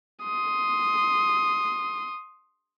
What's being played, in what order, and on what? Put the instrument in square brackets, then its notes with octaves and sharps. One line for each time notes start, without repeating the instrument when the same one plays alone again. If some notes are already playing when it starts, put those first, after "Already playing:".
[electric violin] C6 D#6